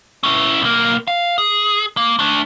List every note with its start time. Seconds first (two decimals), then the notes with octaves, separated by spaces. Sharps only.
0.23 C#4 E4
0.61 B1 A#3
1.08 F5
1.38 G#4
1.97 A#3
2.19 A3 D4